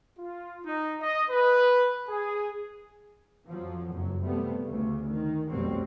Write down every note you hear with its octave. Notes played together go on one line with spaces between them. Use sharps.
F4
D#4
D#5
B4
G#4
F2 F3 F#3
F#1 F2 F#3
C3 G3 A3 B3
D2 C#3
D#3
F1 B1 B2 F#3 G3 C4